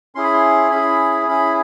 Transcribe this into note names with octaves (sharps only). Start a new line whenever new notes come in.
C#4 E4 G#4 C6
B5
C6
C#4 E4 G#4 B5
C#4 E4 G#4 B5